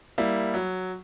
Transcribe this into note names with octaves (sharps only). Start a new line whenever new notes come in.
G3 A#3 E4
F#3